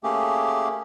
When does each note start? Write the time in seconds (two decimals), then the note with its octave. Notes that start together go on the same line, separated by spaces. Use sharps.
0.03 A3 A#3 C#4 G4 G#4